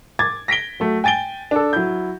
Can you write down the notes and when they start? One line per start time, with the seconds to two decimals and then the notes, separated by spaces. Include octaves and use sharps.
0.19 D6 G#6 A6
0.48 A#6 B6 D7 G7
0.80 F#3 A3
1.04 G5 G#5 A6 D7 G7
1.51 D4 A4
1.73 F#3 E4 G6